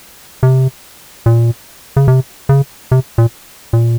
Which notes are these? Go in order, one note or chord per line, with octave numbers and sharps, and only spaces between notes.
C3
A#2
C#3
C3
C#3
C3
A#2
A#2